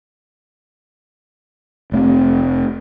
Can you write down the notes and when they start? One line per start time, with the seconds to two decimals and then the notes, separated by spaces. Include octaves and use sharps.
1.92 F1 A3 C4